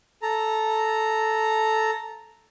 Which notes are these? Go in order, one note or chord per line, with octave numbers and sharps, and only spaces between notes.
A4 A#5